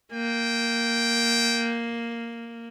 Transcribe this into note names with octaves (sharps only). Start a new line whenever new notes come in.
A#3 G5